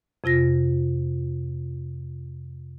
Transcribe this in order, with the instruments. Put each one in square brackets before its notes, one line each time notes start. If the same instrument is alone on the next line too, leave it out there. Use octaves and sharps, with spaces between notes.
[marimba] F2 C3 F4 A#6